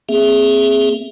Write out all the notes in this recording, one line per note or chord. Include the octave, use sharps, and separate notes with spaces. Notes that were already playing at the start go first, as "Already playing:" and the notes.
A#3 C4 G#4 E5